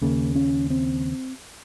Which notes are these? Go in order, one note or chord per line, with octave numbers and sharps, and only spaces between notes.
D#2 C#3 A#3
C#4
C4